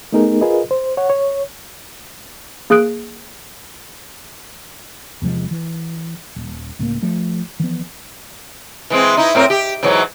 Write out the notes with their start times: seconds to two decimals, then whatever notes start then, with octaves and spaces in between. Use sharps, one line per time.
0.12 A3 B3 D#4 G#4 A#4
0.41 F4 G#4 A#4 B4 D#5
0.71 C5
0.97 C#5 F#5
1.10 C#5
2.70 A#3 G#4 D#6 F#6 D7
5.22 E2 C3 F3 G#3
5.51 E3
6.36 D#1
6.79 C#2 A2 G3 A#3
7.02 F3 A3
7.60 E3 F3 B3
8.90 E3 G#3 C4
9.17 D#4 E4
9.35 A2 C4 A#4
9.50 G4
9.83 G#2 E3 F#3